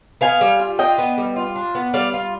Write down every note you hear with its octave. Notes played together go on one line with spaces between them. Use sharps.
B3 F5 G#5
G3
F4
D4 D#5 G5
B3
G3
F4
D4
B3
G3 D5 F5
F4